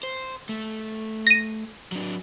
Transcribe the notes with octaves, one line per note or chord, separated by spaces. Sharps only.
C5
A3
A#6 D#7
F#3 D4